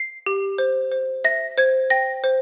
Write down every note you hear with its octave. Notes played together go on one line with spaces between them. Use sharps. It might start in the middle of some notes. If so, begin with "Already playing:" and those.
Already playing: C7
G4
C5
C5
E5 A#6
C5 G#6
G5 A#6
C5